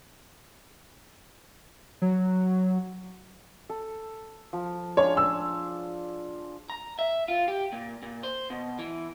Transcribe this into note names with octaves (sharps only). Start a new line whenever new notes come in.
F#3
A4
F3
D4 F4 G#4 C#5
E6
A#5
E5
F4
G4
A#2
A#2
C5
B2
E3